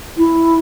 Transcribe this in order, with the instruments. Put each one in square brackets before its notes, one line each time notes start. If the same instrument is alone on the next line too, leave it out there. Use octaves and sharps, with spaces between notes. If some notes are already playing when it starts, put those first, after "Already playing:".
[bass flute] E4